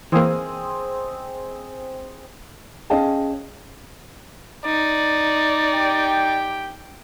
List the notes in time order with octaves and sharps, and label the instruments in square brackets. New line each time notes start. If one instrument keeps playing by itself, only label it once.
[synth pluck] E3 A#3 [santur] C4 G#4 D#5
[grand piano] C#4 G#4 D#5 F5 G5 A5
[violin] D#4 [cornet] D5
[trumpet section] G4 G5